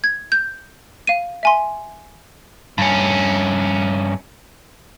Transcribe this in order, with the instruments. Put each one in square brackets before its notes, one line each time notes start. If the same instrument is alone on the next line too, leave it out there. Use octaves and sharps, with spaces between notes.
[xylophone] G#6
G6
F5 D#7
E5 G#5 C6
[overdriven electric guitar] G2 C#4